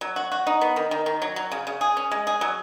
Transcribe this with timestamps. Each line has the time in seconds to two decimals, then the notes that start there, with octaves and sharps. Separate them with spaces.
0.01 F#3
0.16 F#4
0.32 F#4
0.47 D#4
0.61 B3
0.76 D#3
0.91 D#3
1.06 D#3
1.22 F#3
1.36 F#3
1.52 C#3
1.67 C#3
1.81 G#4
1.97 C#4
2.11 G#3
2.27 G#4
2.41 F#3